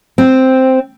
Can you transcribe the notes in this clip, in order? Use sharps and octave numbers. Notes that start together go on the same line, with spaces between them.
C4